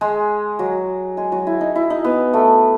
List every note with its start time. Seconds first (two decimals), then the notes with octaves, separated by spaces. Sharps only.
0.01 G#3 G#4
0.59 F#3 F#4
1.17 G#3 G#4
1.32 F#3 F#4
1.47 E4
1.61 D#4
1.76 E4
1.90 D#4
2.04 B3
2.33 A3